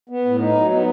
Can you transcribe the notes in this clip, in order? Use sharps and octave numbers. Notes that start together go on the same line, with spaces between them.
B3
A2
D#4
F#3
B3